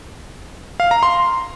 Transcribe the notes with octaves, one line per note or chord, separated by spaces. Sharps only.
F5
A#5
C6